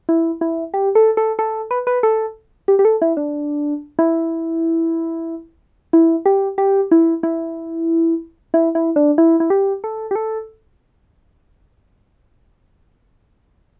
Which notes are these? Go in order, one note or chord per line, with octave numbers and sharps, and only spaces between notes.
E4
E4
G4
A4
A4
A4
B4
B4
A4
G4
G4
A4
E4
D4
E4
E4
G4
G4
E4
E4
E4
E4
D4
E4
E4
G4
A4
G4
A4